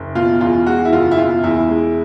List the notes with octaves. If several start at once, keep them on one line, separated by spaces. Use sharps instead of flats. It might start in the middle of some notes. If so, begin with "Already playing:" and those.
Already playing: F#1
B2 F4
E2 F4
G#3 F#4
E4
F#1 F4
E4
B2 F4
E2 E4
G#3